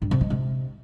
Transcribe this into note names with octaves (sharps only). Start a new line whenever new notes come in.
G2
C3
G#3
C3